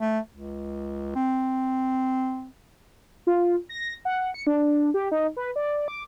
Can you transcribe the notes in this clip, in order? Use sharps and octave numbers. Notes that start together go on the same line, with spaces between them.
A3
C#2
C4
F4
A#6
F#5
C#7
D4
G4
D#4
B4
D5
D6